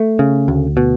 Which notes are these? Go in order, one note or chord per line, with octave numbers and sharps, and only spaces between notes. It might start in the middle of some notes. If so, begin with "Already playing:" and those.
Already playing: A3
C#3
D2
B2